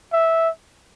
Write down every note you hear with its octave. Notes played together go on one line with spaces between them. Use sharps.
E5